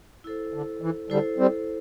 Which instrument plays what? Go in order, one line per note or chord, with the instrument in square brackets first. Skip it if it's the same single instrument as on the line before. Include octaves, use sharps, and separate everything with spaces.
[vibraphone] E4 A4 C5
[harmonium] D3
E3
[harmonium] D3 G3 [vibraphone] E4 A4 C5
[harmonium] G3 C4